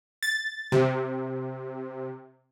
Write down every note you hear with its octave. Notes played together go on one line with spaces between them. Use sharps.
A6
C3